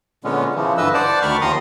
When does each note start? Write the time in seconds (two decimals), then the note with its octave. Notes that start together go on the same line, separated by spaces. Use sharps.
0.24 A#2 D3 G#3 B3 C#4
0.55 C#3 E3 F3
0.77 G2 D3 E3 B4 D#5 E6
0.94 C5 D5 F#5 A5 D6
1.22 D2 D#3 B5 C#6 F6
1.41 D#2 D#3 F3 A#5 C6 D#6